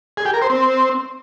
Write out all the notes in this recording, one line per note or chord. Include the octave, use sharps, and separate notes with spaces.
G#4
G4
A#4
C5
C4